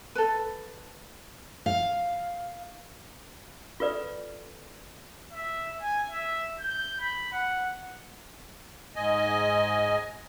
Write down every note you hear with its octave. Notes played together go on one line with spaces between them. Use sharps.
A4 B4
F5
F4 A4 B4 D5
E5
G#5
E5
G6
B5
F#5
G#2 D#5 G#5